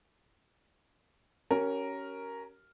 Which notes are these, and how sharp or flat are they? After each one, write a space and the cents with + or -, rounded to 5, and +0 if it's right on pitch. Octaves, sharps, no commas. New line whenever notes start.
C#4 +5 G4 -40 A#4 +0